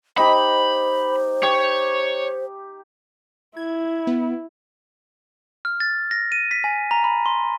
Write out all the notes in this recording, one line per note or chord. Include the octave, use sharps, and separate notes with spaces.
D#4 G4 C5 B5
G4 C#5
E4 G#6
B3
F6
A6
A#6
D#7
B6
G#5
A#5
B5
C6